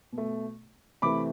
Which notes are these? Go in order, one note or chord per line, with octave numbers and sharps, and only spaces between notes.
B2
A3
C3 E3 A3 B5 D6